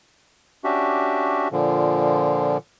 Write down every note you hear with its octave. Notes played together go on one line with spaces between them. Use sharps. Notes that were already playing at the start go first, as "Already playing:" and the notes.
C#4 D4 F#4 G4 E5
A#2 D3 F3